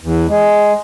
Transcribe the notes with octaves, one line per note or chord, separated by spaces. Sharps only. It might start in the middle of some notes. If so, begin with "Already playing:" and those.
E2
G#3